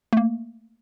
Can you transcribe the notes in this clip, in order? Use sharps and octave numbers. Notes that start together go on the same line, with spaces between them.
A3 A#3